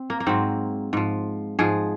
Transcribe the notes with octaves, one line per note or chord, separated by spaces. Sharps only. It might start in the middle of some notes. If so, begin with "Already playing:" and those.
Already playing: C4
A#3
A#3
G#2 F#3 C4
G#2 F3
G#2 F3 G#4